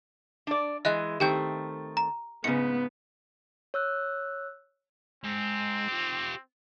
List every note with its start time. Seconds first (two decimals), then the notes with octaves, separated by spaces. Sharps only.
0.47 D4 D5
0.85 E3 G#3 D#5 E5 F#6
1.20 D#3 A3 C4 G4 G5 G6
1.97 A#5
2.44 G#2 C#3 B3 C#7
3.74 C#5 E6 F#6
5.24 G#2 C4
5.88 F4 G4